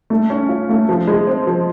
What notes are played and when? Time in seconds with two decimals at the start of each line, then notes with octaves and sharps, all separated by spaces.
0.10 A3
0.30 C#4
0.49 F4
0.69 A3
0.89 F3
1.07 G#3
1.27 C4
1.47 F3